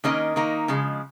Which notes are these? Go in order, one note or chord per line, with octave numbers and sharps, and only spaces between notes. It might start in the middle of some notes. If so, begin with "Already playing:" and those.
D#3 A#3 C#4 A#4 D#5
D#3 A#3 D#4
C#3 F3 G#3